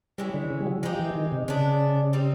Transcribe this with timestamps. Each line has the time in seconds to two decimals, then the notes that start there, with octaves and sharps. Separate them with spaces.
0.18 E3 G3 G#3 C#4 E4
0.34 D3
0.50 C#3
0.60 G3
0.67 F#3
0.83 F3 G#3 C4 D#4 G4
0.99 E3
1.15 D#3
1.32 C3
1.48 C#3 G#3 B3 D4
2.13 G3 C4 D#4